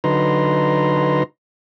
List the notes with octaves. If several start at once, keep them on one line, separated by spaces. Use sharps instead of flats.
D3 F#3 D#4 B4 A#5 C6